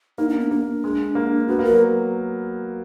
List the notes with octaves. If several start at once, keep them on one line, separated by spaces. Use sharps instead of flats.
A#3 D#4
D4
B3
A#3 D4
G#3
A#3
B3 F#4
A#3
A#4
F#3